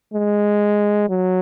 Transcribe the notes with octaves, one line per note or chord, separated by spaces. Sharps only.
G#3
F#3